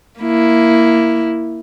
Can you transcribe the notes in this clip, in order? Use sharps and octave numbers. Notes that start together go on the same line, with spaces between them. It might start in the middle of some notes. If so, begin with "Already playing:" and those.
A#3 E4